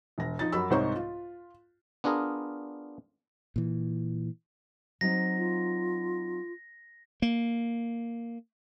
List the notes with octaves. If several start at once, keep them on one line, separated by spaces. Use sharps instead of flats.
E1 A#6
F3 D#4 A6
F#2 F#3 B5 E6
C2 G#2 D#4 C5 C#5 C#6
F4
B3 D4 F4 G#4 A#4
A#2 E3
F#3 C4 D#4 A#6
F4
A#3